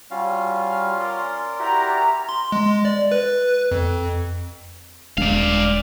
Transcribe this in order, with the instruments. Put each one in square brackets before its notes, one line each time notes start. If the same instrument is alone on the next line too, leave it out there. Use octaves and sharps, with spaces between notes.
[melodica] G3 F#4 [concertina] C#4 F4 F5
[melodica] A#4 D5 C6
[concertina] E4 F#4 G4 [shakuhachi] A#5
[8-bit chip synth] C6
G#3
D5
B4
F2
[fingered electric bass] D#1 G#3 D4 [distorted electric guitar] D5 F5